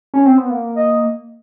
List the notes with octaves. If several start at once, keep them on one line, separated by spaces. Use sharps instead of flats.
C#4
C4
B3
A#3
D#5